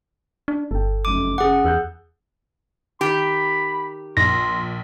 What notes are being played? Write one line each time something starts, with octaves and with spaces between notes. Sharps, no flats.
D4
G1 A4 G5
F1 F#2 D6 D#7
C#3 G#4 F#5 D6
E2 E6 F#6 G6
D#3 G4 B5
A#1 C6 A#6